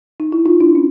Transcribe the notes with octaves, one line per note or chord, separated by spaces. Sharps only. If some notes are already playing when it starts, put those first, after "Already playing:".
D#4
E4
D#4 F4
D4 E4
C#4